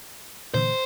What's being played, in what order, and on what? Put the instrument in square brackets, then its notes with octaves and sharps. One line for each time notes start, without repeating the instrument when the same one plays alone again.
[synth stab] A#2 D3 E3 [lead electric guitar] C5